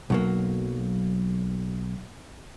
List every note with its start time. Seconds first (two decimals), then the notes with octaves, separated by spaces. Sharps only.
0.10 B1 F#3 A#3